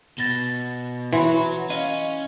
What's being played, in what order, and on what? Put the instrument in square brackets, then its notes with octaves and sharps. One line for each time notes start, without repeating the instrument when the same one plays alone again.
[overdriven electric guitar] B2 [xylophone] A6 A#6 G7
[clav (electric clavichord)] E3 [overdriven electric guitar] F#4 C#5 [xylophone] B5 C6
[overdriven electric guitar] C#4 [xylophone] D#5 F5 D#7